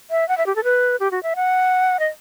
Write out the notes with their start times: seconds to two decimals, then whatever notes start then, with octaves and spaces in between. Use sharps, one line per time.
0.11 E5
0.29 F#5
0.38 E5
0.46 G4
0.56 A4
0.64 B4
1.00 G4
1.11 F#4
1.23 E5
1.36 F#5
1.99 D#5